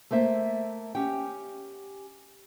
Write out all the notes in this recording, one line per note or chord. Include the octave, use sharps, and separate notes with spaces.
A3 A#3 C5 E5
C#4 G4 F#5 G5